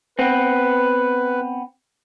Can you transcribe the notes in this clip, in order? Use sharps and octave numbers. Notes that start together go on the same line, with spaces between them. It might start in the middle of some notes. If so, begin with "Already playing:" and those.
B3 C4 B4